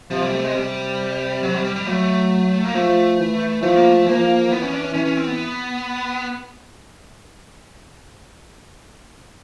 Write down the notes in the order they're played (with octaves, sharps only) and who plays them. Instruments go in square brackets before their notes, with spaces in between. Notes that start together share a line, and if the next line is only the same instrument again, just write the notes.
[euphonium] C3 [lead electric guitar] F3
[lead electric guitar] G3
A3
G#3
[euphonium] C3 [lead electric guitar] G3
[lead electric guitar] F#3
G3
G3
G3
[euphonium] F#3 [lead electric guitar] A3
[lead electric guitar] A#3
[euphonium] F3 [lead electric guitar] A3
[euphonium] E3
[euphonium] F3 [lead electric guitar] A3
[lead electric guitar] A#3
A3
[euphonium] F3 [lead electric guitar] A#3
[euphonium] E3 [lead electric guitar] B3
[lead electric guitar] C#4
D4
C#4
[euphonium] E3 [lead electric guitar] C#4
[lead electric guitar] C#4
C4
B3